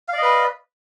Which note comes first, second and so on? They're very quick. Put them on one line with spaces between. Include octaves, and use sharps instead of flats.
F5 D5 D#5 B4